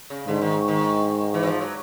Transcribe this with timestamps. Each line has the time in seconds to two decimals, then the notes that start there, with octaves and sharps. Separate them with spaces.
0.10 C#3
0.28 G#2 D3
0.41 D#3
0.68 D#3
1.34 E3
1.43 F#3
1.47 F3
1.61 F#3